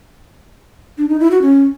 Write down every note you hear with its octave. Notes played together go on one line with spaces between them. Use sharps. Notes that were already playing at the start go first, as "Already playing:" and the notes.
D4
D#4
E4
F#4
C#4